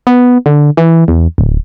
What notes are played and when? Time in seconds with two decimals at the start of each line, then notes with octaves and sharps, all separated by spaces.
0.07 B3
0.46 D3
0.77 E3
1.08 E2
1.38 D1